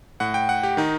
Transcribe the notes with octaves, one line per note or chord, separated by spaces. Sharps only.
A2 F#5
G5
F#5
G4
D#3 D#4